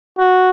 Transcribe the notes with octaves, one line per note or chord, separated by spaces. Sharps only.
F#4